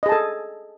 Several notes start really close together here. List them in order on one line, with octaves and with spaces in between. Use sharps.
D#5 G#4 A5 A4